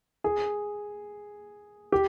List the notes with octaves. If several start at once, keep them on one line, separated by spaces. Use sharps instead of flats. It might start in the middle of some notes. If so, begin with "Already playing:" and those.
G#4
G4